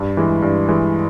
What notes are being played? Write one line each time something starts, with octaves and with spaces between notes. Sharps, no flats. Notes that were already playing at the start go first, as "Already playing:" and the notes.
Already playing: G2
E3 G#3
G2
E3 G#3